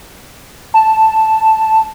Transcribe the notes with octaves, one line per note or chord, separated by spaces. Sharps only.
A5